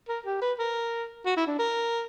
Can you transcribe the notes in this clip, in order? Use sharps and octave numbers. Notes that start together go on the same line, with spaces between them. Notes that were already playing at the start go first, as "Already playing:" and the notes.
A#4
G4
B4
A#4
F#4
E4
D4
A#4